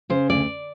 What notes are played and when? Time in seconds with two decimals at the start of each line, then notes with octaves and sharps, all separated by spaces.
0.10 C#3 C5
0.30 D2 D5